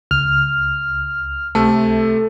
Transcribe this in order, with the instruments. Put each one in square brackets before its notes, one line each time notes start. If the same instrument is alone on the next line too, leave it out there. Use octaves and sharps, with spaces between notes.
[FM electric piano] C#2 [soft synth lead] F6
[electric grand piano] C3 A3 [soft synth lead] A4